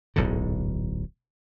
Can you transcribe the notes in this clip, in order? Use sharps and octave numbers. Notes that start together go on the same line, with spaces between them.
D1 B1 G#2 D3